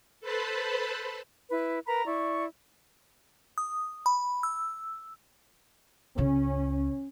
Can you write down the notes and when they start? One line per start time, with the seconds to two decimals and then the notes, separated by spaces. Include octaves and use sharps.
0.20 A4 B4 C5 A5 B5
1.50 E4 B4
1.87 A#4 B4 A#5 B5
2.05 E4 D5 C#6
3.58 D#6
4.06 B5
4.43 E6
6.18 C#2 C#3 C#4